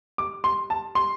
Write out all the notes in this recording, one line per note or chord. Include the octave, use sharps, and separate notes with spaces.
D6
C6
A5
C6